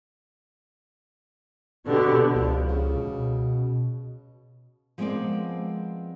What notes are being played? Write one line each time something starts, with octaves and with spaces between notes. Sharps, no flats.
B2 D3 B3 G4
C#2 F3
C#3
B2
F3 G#3 B3 C4 A#4 D5